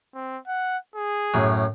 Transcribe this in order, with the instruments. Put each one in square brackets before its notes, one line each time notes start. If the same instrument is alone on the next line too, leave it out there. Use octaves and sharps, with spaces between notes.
[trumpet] C4
F#5
G#4
[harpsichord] F#2 A2